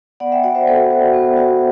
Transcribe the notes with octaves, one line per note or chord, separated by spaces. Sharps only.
B3 D5 F#5
E5 G5
F#4 D5 F#5
C5 E5
B3 A4 C5
F#4
B3
F#4